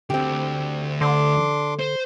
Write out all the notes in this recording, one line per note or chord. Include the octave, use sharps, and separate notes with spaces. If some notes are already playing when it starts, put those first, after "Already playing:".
D2 C4 G4
D3 D4 C6 D6
C5